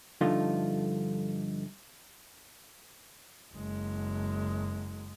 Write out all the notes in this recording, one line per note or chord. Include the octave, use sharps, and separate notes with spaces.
G2 D3 F3 A3 D#4 F4
F#1 G#3